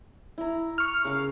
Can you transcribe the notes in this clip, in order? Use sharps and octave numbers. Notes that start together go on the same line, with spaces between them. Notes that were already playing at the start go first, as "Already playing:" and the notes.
E4 A#5
C#6 F6
C#3 A#4 F5